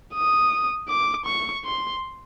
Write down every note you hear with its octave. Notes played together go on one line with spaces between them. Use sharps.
D#6
D6
C#6
C6